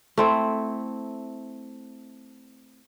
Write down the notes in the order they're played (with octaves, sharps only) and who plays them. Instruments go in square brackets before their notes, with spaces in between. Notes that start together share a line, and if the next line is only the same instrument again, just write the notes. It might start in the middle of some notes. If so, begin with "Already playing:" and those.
[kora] A3 C4 E4